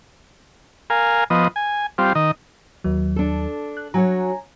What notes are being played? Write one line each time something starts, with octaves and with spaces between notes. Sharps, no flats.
A#4 F5 G#5
F3 B3 D#5
G#5
G3 C4 F4
D#3 D#5
D#2 F#3
D4 A4
F#6
F#3 F#4 C#5 G#5 A#5